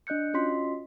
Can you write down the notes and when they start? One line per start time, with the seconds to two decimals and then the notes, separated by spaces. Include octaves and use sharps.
0.07 D4 D#5 F#6 G6 C#7
0.34 C#4 F4 F#4 D#5 C6 B6